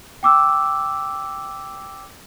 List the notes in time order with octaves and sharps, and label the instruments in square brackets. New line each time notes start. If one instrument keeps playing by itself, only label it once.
[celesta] G5 D6 E6